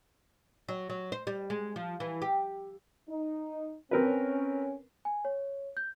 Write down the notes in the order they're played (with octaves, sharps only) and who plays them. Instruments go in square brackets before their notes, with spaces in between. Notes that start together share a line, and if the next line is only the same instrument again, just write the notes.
[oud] F#3
F#3
C5
G3
G#3
F3
E3
G4
[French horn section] D#4
[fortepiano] C4 A#4 B4 [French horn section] C#4
[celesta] G#5
C#5
G6